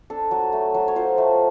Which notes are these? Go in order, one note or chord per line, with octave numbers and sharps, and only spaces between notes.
D4 A4
F#3
A3
F#3
C#5
F4 C5
A3